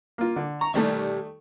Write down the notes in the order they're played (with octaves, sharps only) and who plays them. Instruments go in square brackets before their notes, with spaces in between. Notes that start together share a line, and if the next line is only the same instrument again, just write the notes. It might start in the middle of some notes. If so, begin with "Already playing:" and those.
[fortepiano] A#3 F4
D3
[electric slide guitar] A#5 [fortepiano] C#6
[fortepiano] D#3 G3 A3 [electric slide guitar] G4 D5 E5